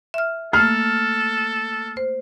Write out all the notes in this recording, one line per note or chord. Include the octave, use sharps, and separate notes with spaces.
E5 F6
A3 A#3 A4 F6
C5